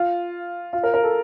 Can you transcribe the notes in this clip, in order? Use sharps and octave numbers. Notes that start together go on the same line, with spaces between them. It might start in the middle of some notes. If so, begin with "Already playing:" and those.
Already playing: F4
F4
A#4
A#4
A4